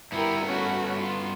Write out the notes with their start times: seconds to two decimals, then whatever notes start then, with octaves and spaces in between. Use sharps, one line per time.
0.12 G2 B3 E4 G4 A#4
0.44 A3 C#4 F#4
0.99 F4